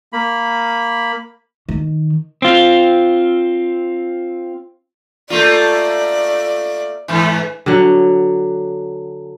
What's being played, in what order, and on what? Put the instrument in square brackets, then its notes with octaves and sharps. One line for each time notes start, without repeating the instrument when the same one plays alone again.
[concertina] A#3 B5
[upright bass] D#3
[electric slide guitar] C4 F4
[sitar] A3 A#3 F4 [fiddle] D5
[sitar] G#2 E3
[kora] D3 F#3